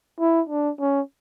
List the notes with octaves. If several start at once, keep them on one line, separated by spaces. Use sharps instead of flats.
E4
D4
C#4